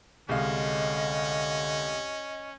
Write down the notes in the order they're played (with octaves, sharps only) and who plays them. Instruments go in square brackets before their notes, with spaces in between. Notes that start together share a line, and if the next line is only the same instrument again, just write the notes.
[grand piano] C2 G#3 F5 [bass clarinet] D3 [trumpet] C#4 [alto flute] D#5